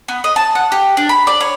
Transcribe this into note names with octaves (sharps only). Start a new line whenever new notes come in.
B3
D#5
A5
F#5
G4
D4
B5
D5
C#5